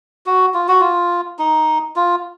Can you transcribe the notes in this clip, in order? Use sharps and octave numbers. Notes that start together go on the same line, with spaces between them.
F#4
F4
F#4
F4
D#4
F4